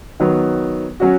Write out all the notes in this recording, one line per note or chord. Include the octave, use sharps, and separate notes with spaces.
D#3 F#3 B3
F#3 C#4 F#4